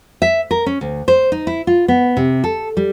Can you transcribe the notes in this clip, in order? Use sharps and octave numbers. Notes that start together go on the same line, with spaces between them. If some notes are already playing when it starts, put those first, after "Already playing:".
E5
A#4
C#4
D2
C5
D#4
E4
F4
B3
C3
A4
G3